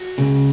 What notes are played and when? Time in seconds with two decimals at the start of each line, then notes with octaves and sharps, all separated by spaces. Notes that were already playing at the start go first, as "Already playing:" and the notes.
Already playing: F#4
0.18 C#2 C#3